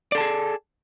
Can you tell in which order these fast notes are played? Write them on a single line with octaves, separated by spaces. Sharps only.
D5 A4 A5 G#4